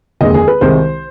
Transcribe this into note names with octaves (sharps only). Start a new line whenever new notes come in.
F1 D#2 D3 G#3 D#5
G#4
B4
C2 C3 D#3 G#3 C5